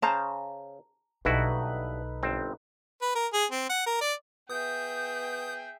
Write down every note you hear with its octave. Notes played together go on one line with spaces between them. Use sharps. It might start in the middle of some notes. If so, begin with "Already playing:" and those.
C#3 C5 A5 A#5
B1 G2 D#4 E4 F#4 A4 B4
G1 C4
B4
A#4
G#4
C4
F#5
A#4
D5
B3 G#4 E5 G5 D#6 G6